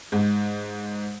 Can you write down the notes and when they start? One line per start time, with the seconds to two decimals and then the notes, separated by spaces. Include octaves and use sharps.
0.12 G#2